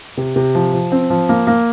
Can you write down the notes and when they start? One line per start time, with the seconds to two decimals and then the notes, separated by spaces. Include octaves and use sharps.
0.17 C3
0.36 C3
0.55 F3
0.73 F3
0.92 C4
1.10 F3
1.29 A#3
1.47 A#3